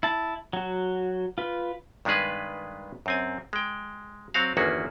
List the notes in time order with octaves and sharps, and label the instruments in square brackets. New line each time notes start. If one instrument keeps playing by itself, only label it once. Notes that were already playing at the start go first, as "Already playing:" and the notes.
[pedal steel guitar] E4 A5
F#3 F#4
F4 B4
[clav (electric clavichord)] G2 D#3 G#3 B3 G#4 B4
F#2 C4 G#5
G#3 G5
F#3 C4 F#4 F5
G1 E2 D#3 A#3 C#4 F#4